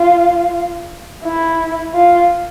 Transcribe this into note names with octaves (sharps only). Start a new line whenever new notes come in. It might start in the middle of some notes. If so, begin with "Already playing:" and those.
Already playing: F4
E4
F4